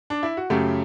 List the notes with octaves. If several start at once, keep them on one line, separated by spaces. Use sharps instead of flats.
D4
E4
F#4
F#2 C#3 F#3 A3 G4